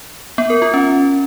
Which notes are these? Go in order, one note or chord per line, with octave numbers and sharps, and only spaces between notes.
B3
A#4
F4
C#4